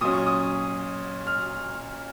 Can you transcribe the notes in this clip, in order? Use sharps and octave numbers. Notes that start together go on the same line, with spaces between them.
A#2 F#3 C#4 D#6
C#6
D#6
F6